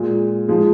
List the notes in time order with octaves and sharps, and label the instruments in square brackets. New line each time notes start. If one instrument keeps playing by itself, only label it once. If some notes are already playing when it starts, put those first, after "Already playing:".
Already playing: [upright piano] A#2 G#3
F3 G#3